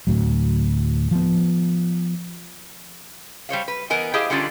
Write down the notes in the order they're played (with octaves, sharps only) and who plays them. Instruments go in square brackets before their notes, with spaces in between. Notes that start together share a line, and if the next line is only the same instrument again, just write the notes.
[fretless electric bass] D2 A2 F#3
F3 B3
[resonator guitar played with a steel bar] G3 C5 C#5 F5
B4
E3 B3 A#4 D#5 G#5
E4 G4 G#4 C5 D#5 F5
D3 G3 C#4 D4 F4